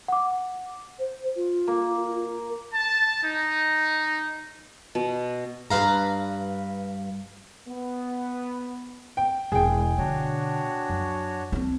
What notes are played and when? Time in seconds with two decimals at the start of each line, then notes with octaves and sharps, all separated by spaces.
0.08 F#5 D6
0.99 C5
1.36 F4
1.67 A#3
2.73 A5
3.24 D#4
4.95 B2
5.70 G2 B4 F5 A#5
7.68 B3
9.17 G5
9.52 E1 G#4 G5
9.98 B2 D3 D4 F#4 C#5
10.90 F#2
11.52 C4 C#4